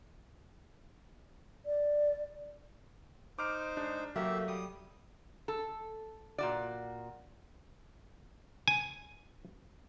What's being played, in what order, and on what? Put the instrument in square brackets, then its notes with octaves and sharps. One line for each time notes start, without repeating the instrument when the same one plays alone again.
[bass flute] D5
[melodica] D#4 C5 [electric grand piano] D6 F6 D7
[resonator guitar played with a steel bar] G#3 [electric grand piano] D4
[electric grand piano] F#3 [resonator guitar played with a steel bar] A3 A#3 [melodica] G4 E5
[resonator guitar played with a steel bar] G3 [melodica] D#6
[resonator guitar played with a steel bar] A4
A#2 F#4 D5
[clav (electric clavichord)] G#5